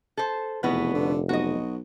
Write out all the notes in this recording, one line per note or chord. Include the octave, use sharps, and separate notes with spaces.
A4 C5
F1 E2 B2 B3 B4
D3
B1 F#4 D#5